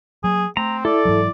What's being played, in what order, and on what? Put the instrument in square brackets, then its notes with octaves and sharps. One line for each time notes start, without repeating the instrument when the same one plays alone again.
[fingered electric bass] F#3 A#3 [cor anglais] G#4
[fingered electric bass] A3 [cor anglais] C4 [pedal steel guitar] A#5
[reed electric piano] E4 [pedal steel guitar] A4 [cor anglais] D5
[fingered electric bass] G#2 E3 F#3